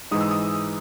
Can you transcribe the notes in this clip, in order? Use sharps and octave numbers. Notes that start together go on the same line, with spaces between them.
G#2 E3 G#3 D#4 D#6
E6
D#6